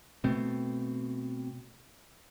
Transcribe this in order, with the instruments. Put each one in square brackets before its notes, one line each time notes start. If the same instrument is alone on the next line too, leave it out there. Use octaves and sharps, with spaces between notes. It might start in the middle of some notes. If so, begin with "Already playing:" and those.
[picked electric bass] B2 A3 C4